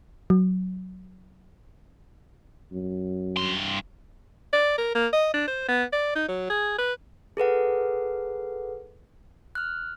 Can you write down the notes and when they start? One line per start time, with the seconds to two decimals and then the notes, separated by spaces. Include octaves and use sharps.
0.30 F#3
2.72 F#2
3.37 G2 C6
4.53 D5
4.78 A#4
4.95 A#3
5.13 D#5
5.34 D4
5.48 C5
5.69 B3
5.93 D5
6.16 D#4
6.28 F#3
6.50 G#4
6.78 B4
7.37 G#4 A4 B4 F#5
9.55 F6 F#6